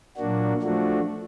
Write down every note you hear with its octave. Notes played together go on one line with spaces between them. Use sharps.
A#2 F#3 A#3 D4 F#4
F3 A3 D4 F#4